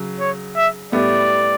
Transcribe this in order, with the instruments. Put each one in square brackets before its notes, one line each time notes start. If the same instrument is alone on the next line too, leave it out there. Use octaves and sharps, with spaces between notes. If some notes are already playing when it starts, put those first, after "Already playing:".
Already playing: [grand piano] C#3 F#3
[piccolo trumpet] C#5
E5
[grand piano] A2 G3 B3 E4 G4 [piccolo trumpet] D5